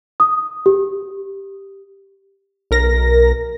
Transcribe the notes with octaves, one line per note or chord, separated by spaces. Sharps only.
D#6
G4
B1 A#4 A#6